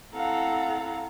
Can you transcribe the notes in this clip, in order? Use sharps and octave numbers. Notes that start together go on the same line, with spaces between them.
C4 E4 A4 F5 F#5 A#5